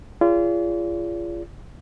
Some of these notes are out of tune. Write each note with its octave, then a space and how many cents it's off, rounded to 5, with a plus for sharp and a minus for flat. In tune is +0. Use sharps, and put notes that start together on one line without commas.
F4 -30 G#4 -15 D5 -40